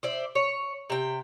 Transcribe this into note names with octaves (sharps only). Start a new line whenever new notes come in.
C5 D5 E5
C#5
C3 G5